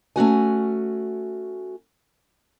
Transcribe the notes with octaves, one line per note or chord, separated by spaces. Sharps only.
A3 C#4 F#4 G#5